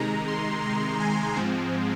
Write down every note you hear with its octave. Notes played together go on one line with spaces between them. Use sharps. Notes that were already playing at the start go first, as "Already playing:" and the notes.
Already playing: C3 D#3 G#3 A#5
C6
A#5
G#5
G#2 F3 G#3 C4